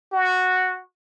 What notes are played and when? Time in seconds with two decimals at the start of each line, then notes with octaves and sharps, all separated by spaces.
0.12 F#4